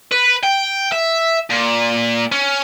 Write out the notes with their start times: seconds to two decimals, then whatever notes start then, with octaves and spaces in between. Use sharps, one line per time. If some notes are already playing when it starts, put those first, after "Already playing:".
0.12 B4
0.43 G5
0.92 E5
1.50 A#2
2.32 C#4